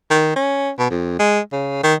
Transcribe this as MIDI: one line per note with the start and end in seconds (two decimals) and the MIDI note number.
0.11 0.35 51
0.36 0.70 61
0.79 0.89 47
0.91 1.18 41
1.19 1.40 56
1.52 1.82 49
1.83 1.94 51